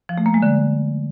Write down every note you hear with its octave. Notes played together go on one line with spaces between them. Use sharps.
F3
A3
A#3
G#3
D3